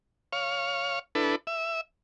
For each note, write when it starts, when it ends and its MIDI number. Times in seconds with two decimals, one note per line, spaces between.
0.33 0.99 73
0.33 0.99 77
1.15 1.36 62
1.15 1.36 64
1.15 1.36 69
1.15 1.36 71
1.47 1.81 76